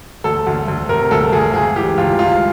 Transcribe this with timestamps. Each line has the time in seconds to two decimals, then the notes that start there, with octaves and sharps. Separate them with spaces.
0.24 D2 A4
0.47 D2
0.68 D2
0.89 C3 A#4
1.11 D2 A4
1.33 D2 G#4
1.54 C#2 G#4
1.76 E3 G4
1.98 C#2 F4
2.19 C#2 F4